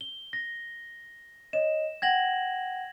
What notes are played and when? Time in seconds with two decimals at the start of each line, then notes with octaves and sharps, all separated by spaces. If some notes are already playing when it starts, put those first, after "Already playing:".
0.01 G7
0.33 A#6
1.53 C#5 D#5 E7
2.02 F#5 G5 G#6 A#6 F#7